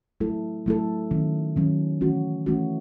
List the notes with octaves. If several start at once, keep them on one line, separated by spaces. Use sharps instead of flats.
F#3 A3 E4 A4
F#3 A3 E4 A4
D#3 F#3 C#4
D#3 F#3 C#4
E3 A3 C#4 F#4
E3 A3 C#4 F#4